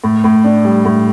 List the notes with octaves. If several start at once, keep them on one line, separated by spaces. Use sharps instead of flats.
A2
A2
D4
G3
A2